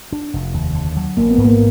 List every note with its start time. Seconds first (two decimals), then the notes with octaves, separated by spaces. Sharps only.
0.12 D4
0.34 F1
0.54 D#2
0.75 D3
0.97 F#3
1.17 A1 A#3
1.30 B3
1.38 G#2
1.44 A#3